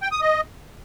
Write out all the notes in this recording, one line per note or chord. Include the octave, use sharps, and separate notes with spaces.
G5
D#6
D#5